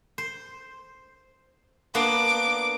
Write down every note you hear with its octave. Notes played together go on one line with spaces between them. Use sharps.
C5
A#3 B3 D4 D6